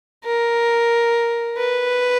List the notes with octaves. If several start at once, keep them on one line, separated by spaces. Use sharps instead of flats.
A#4
B4